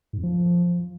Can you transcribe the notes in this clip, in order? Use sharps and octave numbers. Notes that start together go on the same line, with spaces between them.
G#2
F2
F3